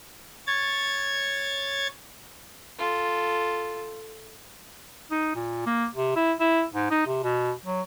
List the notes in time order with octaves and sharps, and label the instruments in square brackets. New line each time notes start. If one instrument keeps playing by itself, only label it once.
[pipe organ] C#5 G#6 A6
[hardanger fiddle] F4 A4
[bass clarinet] D#4
A#2
A#3
C3
E4
E4
G#2
D#4
C3
B2
F#3